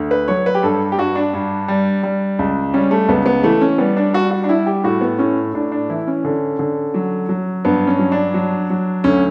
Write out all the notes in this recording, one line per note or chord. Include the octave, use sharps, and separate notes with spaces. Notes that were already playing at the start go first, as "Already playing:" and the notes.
Already playing: D2
B4
F#3 C#5
B4
G4
G2 A4
G4
G2 F#4
D4
G2
G3
G3
C#2
G3 C#4
A3
C#2 B3
B3
E3 A3
C#4
G3 B3
D4
G3 F#4
F#4
D4
G3 E4
G4
A2 F#4
B3
A2 C#4
A2 D4
D4
E3 E4
C#4
D3
D3
F#3
F#3
G2 B3
C#4
F#3
D4
F#3
F#3
D2 C#4